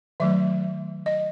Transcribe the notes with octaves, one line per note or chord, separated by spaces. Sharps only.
D#3 F#3 A3 E5
D#5